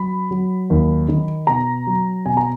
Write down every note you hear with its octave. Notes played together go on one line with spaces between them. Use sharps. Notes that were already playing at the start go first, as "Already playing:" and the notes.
Already playing: F#3 B5
F#3
D#2
D#3
B2 A#5
F#3
B2 G#5
A#5